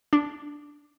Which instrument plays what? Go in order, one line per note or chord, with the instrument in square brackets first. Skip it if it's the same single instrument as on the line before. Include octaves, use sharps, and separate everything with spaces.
[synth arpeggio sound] D4